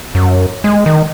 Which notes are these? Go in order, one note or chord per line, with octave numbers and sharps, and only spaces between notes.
F#2
G#3
D#3